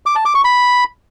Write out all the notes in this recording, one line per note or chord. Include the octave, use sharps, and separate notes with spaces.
D6
A5
D6
C#6
B5